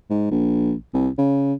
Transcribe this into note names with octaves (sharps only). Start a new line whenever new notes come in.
G#2
A#1
C2
C#3